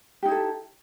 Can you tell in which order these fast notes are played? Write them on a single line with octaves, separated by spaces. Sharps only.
G4 D#4 E4 A4